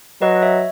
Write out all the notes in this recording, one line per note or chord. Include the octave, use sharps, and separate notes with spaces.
F#3 B4 D#5
C#5 E5